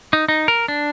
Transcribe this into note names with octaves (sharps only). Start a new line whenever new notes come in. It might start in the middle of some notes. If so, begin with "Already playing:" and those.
D#4
D#4
A#4
D4